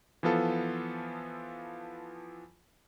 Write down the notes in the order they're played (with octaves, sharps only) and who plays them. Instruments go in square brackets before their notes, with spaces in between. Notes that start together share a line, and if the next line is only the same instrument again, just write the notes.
[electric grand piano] E3 F3 B3 F4 A4